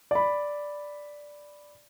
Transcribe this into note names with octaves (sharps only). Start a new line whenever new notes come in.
D5 B5